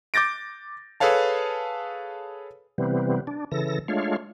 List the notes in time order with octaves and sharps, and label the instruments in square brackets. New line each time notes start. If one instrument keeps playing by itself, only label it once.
[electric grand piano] D6 G6 A6 A#6 D7
G#4 A4 B4 C#5 F5 A5
[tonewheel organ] C3 E3 G3 B3 C4
D4
C#3 E3 A4 A#6
G#3 A3 D4 F4 C#5 F5